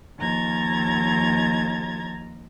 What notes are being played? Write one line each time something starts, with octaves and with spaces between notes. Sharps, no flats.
D#2 F3 A#5 G#6 A6